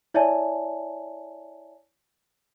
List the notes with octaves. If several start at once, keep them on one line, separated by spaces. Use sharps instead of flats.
E4 C#5 D5 E5 G#5 A5